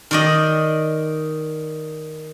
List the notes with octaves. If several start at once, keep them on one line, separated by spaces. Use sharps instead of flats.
D#3 D5 D#5